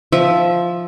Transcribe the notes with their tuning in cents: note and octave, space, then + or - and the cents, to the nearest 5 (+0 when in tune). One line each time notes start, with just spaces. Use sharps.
F3 +0 E5 +0